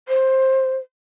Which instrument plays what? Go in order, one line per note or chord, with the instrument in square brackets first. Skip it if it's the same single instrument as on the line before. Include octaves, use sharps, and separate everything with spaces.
[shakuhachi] C5